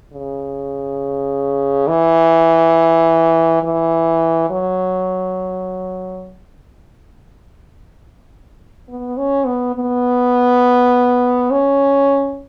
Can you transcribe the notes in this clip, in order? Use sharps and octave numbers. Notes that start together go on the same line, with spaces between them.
C#3
E3
E3
F#3
B3
C#4
B3
B3
C#4